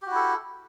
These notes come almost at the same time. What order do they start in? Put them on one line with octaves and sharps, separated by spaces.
G4 F#4 E4 A4